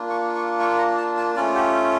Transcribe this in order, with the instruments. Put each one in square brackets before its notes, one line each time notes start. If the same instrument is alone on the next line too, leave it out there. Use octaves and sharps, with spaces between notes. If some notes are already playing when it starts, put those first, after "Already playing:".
Already playing: [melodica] A#3 D4 F4
C#6
C#6
C#6
A#5
A5
A5
A3 C#4 F4 D5
G4